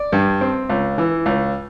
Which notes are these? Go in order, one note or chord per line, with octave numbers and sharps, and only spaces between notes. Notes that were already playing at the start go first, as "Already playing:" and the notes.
Already playing: D5
G2
C4
C#2
E3
C#2